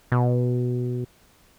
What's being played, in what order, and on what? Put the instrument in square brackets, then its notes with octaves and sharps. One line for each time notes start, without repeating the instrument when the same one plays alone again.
[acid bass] B2